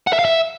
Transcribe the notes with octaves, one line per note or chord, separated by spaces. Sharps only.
F#5
E5
F5
E5